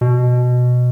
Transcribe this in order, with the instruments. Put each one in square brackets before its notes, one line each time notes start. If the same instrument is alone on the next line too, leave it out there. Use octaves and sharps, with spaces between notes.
[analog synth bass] B2